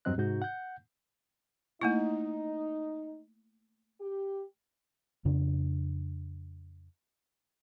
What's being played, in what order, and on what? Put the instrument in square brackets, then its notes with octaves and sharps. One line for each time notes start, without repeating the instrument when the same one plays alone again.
[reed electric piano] E2 G2 F#3 C4 D#5 F#6
G#2 C3 D#4 F#4 G6
F#5 G6
[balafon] A3 A#3 E4 [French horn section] D#4
[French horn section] G4
[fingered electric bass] F2 C#3 D4